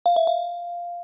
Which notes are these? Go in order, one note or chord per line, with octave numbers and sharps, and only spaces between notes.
F5
E5
F5